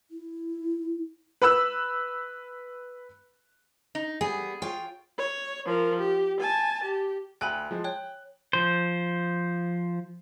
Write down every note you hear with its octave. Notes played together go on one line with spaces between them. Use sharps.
E4
B4 B5 E6 F#6
D#4
G3 B3 G#4
F4 C#5 G5
C#5
F3 A#4
G4
G#5 A5
G4
D2 G5 G#5 B5 F#6
F3 G#3
C#5 G5 F#6
F3 C5